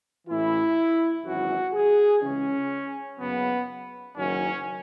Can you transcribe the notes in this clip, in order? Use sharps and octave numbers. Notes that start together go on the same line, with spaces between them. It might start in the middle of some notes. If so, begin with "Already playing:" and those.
A1 A2 E3 E4
G#1 F#2 E3 F#4
G#4
C#2 C#3 E3 C#4
F#1 F#2 C#3 F#3 B3
F#1 F#2 D#3 F#3 C#4